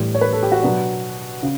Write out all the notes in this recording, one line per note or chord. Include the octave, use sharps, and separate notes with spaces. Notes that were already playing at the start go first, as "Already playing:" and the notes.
Already playing: A2 E3 G3 D4
C#5
B4
A4
G4
F#4
B2 F#3 B3 D4
C#3